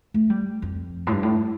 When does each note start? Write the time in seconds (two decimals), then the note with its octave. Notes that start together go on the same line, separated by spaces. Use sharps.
0.14 A3
0.30 G3
0.62 F2
1.07 A2
1.12 G2
1.23 A2